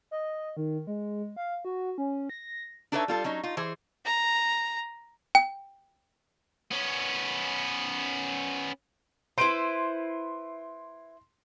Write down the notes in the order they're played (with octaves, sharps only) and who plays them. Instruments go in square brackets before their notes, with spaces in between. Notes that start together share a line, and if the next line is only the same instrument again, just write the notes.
[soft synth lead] D#5
D#3
G#3
F5
F#4
C#4
A#6
[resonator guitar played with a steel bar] D4 D#4 A4 B4 C#5 E5
G3 F4 A4
F#3 C#4 D#4
D#4 F4
E3 G#4 C5
[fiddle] A#5
[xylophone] G5
[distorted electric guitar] B3 C#4
[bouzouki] E4 B4 C5 [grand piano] C6 D7